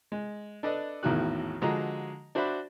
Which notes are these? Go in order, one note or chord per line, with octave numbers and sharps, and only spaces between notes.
G#3
D4 A4 B4 D5 D#5
G#1 E2 A2 D#3 F#4 F#6
D3 F3 G#3 F#4 D#5 A#5
D4 F#4 C5 D5 E5 B5